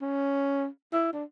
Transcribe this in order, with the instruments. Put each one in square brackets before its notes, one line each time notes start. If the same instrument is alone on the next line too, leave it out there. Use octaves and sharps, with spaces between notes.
[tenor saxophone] C#4
E4
D4